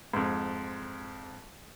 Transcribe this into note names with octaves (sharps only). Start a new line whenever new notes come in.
F2 G#2